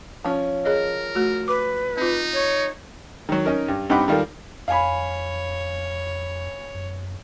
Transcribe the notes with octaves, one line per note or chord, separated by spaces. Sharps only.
F3 C#4
G#4 A#4 C#5 D#5
A3 F#4
B4 D6
C4 D#4 F4
C#5
D#3 F#3
C#4 D#4 A#4
G2
G2 C4 D#4 F#5 B5 D6
D#3 G3 F4 A4 A#4
F2 C#5 F5 G#5 B5
F#2